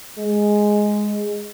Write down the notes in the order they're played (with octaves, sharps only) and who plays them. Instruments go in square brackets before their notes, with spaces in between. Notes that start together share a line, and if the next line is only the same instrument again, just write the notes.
[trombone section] G#3